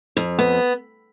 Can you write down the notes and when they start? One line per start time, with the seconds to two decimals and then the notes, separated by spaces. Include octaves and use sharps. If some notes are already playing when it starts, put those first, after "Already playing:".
0.17 F2
0.39 B3